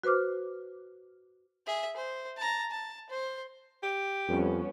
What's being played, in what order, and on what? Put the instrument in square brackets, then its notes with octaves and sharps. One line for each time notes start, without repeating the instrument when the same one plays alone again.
[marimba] F#4 B4 C5 D6 F6
[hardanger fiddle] G#4 E5
C5
A5 A#5
A5
C5
[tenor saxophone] G4
[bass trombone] F2 [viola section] G3 B3 C#4